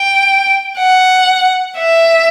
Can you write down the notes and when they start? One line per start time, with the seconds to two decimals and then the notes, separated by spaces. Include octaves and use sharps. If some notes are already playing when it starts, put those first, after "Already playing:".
Already playing: G5
0.79 F#5
1.78 E5